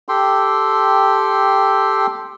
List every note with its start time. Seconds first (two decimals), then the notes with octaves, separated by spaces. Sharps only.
0.09 G4 A4 G5 C6